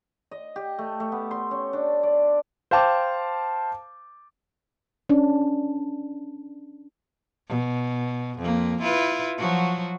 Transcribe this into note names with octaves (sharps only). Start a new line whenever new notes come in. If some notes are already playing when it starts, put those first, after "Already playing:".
D#5
G4
A3
A3
B3
C6
C#4
D4
D5
C5 F5 G5 A5 D6
C#4 D4
B2
F2 A#3
E4 F4 B4
F3 F#3 F#4